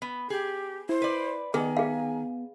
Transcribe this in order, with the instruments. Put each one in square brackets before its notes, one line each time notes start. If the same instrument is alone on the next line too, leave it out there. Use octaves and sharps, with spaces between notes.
[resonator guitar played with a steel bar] B3
[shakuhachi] G4 [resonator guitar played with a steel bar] G#4
[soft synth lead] E4 [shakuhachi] C5
[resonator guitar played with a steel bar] B4 D5
[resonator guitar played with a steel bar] D#3 [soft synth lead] B3 [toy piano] G#4 [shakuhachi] G#5
[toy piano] G#4 F5